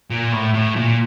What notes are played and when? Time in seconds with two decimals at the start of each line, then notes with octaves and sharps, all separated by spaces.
0.11 A#2
0.32 A2
0.54 A2
0.76 A#2